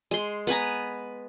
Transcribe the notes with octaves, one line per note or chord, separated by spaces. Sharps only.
G#3 C6
B3 B4 G#5 A#5